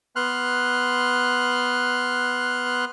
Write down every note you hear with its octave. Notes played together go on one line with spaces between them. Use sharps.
B3 C6 F6 F#6